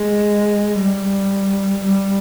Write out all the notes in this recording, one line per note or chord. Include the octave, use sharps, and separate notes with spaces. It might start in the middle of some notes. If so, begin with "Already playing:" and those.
Already playing: G#3
G3
G3